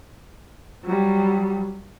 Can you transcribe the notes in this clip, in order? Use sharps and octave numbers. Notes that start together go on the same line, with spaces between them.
F#3 G3